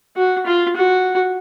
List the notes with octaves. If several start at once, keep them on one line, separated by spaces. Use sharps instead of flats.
F#4
F4
F#4